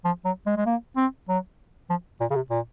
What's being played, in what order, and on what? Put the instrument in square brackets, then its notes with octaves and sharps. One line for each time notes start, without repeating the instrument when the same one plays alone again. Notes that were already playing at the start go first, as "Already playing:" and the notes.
[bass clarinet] F3
F#3
G#3
G#3
A#3
C4
F#3
F3
A#2
C#3
C3
A#2